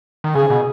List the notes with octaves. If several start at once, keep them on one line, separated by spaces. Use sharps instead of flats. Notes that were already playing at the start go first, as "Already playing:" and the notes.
D#3
C#3 G#4
B2